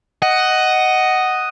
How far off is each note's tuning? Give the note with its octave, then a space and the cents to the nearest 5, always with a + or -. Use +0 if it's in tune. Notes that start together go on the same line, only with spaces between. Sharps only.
D#5 +0 F#5 +10